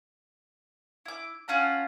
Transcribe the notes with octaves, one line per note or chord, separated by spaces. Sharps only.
E4 D6
C#4 F4 F#5 A5